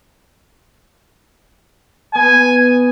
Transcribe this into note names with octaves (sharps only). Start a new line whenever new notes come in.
B3 G#5